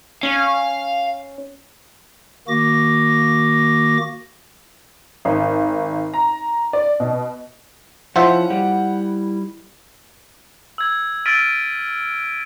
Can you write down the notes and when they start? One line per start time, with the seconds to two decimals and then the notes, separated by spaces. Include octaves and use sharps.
0.23 C#4 F5
2.48 D#3 A#3 F#4 D6 A#6
5.25 G#1
6.14 A#5
6.73 D5
7.00 B2
8.16 F3 C#4 E4 F4 C5 E5 F#5
8.50 G3
10.78 E6 G#6
11.26 E6 F6 A6 B6 D7 D#7